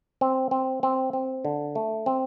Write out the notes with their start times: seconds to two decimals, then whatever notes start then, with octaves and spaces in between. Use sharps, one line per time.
0.21 C4
0.51 C4
0.83 C4
1.13 C4
1.45 D3
1.75 A3
2.06 C4